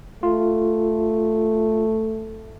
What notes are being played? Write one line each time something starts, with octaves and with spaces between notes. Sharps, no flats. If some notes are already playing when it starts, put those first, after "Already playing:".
A3 F4